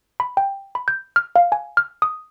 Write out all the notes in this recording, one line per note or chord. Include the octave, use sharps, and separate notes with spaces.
B5
G5
B5
G6
F6
F5
G#5
F6
D#6